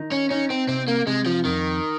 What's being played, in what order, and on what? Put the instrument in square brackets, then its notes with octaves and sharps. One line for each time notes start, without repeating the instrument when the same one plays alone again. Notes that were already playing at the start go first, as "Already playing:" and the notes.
Already playing: [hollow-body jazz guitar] D#3 D#4
[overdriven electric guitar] C#4
[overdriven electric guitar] C#4 [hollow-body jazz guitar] D#4
[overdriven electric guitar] C4
[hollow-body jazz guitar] C3 [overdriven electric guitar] C4
[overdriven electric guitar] A#3
[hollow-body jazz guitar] C3 [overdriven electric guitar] G#3
[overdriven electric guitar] F3
[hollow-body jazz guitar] F2 [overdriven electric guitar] D#3